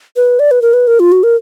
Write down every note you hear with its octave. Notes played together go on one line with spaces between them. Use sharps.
B4
D5
B4
A#4
B4
A#4
F4
F#4
A#4